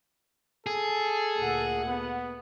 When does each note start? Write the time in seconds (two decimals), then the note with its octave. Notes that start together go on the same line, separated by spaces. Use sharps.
0.67 G#4 A4
1.37 D2 A#2 F#5
1.87 B3